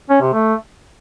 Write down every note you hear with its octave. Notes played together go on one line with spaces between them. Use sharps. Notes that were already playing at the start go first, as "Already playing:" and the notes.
C#4
C3
A3